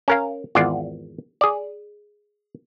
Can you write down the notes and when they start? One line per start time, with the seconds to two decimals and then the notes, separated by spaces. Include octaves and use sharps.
0.08 C#4 A#4 F5
0.55 G#1 E2 F4 D5 F#5
1.41 G#4 D5